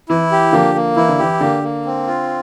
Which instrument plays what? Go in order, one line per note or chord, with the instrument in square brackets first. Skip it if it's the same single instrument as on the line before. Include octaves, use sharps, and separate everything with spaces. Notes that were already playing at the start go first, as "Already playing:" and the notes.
[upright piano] E3 [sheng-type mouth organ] E4
[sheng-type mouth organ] G4
[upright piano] D3 F3 [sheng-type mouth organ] A#3
[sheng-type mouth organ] A#3
[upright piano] E3 [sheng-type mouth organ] E4
[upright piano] D3
[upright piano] E3 [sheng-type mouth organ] G4
[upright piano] D3 [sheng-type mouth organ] A#3
[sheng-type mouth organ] A#3
C4
F4